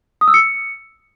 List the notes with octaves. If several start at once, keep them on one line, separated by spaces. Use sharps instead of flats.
D#6
E6
C#7